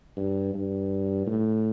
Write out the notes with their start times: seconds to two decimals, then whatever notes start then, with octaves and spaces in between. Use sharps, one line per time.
0.17 G2
0.54 G2
1.27 A2